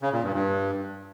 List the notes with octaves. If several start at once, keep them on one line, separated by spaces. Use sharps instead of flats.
C#3
A#2
G2
G2